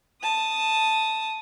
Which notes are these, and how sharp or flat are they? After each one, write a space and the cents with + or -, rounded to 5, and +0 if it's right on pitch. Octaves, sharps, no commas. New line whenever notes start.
A5 +0 D#6 +0